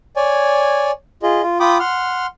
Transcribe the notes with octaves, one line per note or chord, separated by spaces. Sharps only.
C#5 D5 G#5
F4 G#4 D#5
F4
F4 G5 B5 D6 D#6
F#5 C6 F6